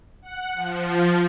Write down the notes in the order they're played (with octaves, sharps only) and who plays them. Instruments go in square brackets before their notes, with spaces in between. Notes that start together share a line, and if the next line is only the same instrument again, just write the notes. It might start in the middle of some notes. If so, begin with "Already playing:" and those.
[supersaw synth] F#5
F3